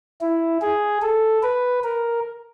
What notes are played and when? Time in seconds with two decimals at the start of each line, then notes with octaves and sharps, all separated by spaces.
0.21 E4
0.62 G#4
1.02 A4
1.43 B4
1.84 A#4